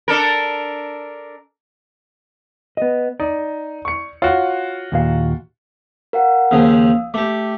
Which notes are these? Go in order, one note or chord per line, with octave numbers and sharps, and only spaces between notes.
D4 A4 A#4
B3 D#5
D#4 D5
C#6 C#7
F4 F#4 C#5
D#2 A#2 F5
A#4 F5 F#5
D#2 C#3 F3 F5 D#6 E6
A3 G4 D6